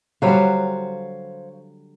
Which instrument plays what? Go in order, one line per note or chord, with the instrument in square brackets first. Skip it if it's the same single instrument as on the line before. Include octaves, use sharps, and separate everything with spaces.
[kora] D3 F#3 G3 [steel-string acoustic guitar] C5 C#5 F5